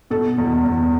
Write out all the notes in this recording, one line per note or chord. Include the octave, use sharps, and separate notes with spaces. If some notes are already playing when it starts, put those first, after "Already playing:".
B2 A4
E2
E2